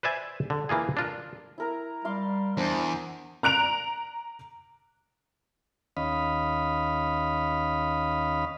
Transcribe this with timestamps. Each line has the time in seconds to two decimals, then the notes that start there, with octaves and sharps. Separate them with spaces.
0.03 B4 C5 D5 E5 G#5
0.50 D3
0.69 E3 A#3 F4 G#4
0.97 D4 F4 A#4
1.58 E4 A#4 A#5
2.05 G3 F5 C6 D6
2.57 E2 D4 C5
3.43 A#5 F#6 D7 F7
5.97 D#2 C#4 D#5 F5 B5